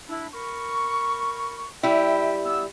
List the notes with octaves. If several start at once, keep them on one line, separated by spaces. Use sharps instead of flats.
D4 E4
A#4 B5 C#6
G3 E4 E5 G5
B3 E6